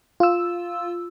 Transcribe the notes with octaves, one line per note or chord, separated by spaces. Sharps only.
F4 E6